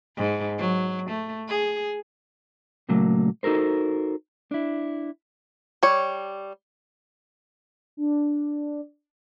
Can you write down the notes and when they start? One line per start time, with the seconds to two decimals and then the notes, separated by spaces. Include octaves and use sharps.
0.17 G#2
0.59 F#3
1.10 A3
1.49 G#4
2.89 A#2 C#3 F#3 A3 A#3
3.43 D#4 F#4 A4 A#4 C5
4.51 D4 E4
5.83 G3 C#5
7.97 D4